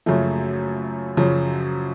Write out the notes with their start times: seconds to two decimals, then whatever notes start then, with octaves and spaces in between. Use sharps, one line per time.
0.06 F#2 C#3 F3 A3
1.17 F#2 C#3 F3